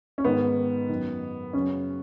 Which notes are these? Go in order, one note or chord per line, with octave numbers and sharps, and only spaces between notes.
C#4
G#2 D#3 B3
F#2 D#3
F#2 C#3 C#4